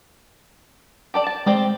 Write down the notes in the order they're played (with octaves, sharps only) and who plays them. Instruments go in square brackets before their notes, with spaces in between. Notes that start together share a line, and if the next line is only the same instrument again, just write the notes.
[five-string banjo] G4 A4 D5
A5
[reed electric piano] G#3 [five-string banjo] C4 G4 D5